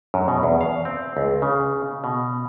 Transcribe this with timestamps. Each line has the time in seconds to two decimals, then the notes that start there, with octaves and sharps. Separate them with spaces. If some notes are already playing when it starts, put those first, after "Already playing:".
0.14 F#2
0.28 B2
0.43 E2
0.61 F5
0.85 C4
1.17 C#2
1.42 C#3
2.04 B2